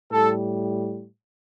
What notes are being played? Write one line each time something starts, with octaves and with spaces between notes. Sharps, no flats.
A2 G3 A4